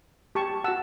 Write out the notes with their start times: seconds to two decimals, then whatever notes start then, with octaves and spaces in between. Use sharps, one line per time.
0.35 G4 A5 C#6
0.64 F#4 F#5 A5 E6